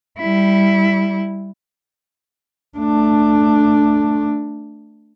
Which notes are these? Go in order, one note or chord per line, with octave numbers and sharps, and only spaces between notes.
G3 E4
A3 D4